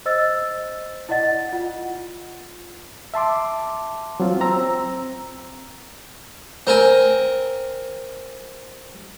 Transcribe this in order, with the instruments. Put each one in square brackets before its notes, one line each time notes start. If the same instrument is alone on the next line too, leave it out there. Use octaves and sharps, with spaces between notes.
[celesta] C5 D#5 E6 A6
E4 D5 D#5 F#5 A6
F4 F#5
[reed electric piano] E5 A5 C6 D6
F#3 C4 F4
C4 A#5 E6
[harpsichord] C4 A#4 G#5